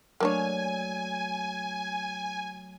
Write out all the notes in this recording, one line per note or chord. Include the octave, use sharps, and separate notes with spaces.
F#3 A3 A#3 D4 C#5 G#5